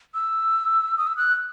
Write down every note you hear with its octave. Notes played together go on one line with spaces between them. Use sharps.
E6
D#6
E6
F#6